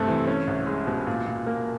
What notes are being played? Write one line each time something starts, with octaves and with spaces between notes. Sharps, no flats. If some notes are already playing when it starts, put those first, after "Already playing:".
Already playing: G2 C3 A3 C4
E3
C#4
C2
G#3
B2
A#2
A#2
A#3